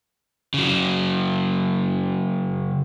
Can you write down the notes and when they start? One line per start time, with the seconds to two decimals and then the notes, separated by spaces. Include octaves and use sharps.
0.54 C#3 F#3